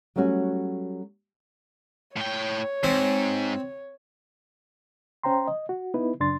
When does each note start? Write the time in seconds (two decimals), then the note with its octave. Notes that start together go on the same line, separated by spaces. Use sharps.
0.16 F#3 G3 A3 C#4 F#4
2.16 A2 C#5 G5
2.84 G#2 C4
5.23 C#4 C5 G5 A#5 C6
5.47 D#5
5.69 F#4
5.94 B3 D#4 E4 B4
6.20 F#2 C#3 D4 C6 A6